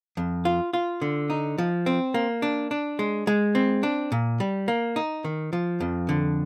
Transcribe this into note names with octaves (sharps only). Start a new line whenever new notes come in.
F2
F4
F4
D3
D#4
F3
C4
A#3
D4
D4
G#3
G#3
C4
D4
A#2
G3
A#3
D#4
D#3
F3
F2
D3